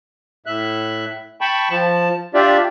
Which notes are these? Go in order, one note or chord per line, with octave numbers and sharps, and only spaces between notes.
A2 E5 F#6
G5 A5 B5 C#6
F3 A5
D4 F4 G4 D5 E5